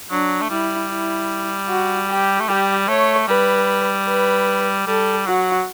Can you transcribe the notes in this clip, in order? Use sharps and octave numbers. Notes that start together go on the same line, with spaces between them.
F#3 D4
A3
G3 E4
E4
F#4
G4
A3
G3 G4
A3 C#5
G3 B4
B4
G3 A4
F#3 F#4